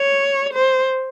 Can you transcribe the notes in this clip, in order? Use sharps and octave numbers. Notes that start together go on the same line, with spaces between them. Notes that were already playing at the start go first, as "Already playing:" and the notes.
Already playing: C#5
C5